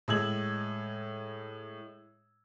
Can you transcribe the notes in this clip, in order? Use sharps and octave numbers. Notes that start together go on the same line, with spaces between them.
A2 G#3 E6 G#6 F#7